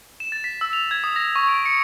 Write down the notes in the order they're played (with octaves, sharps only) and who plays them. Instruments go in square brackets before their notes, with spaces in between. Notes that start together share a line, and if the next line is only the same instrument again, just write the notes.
[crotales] E7
A6
B6
E6
F7
G#6
D#6
A#6
C#6
D7
C#7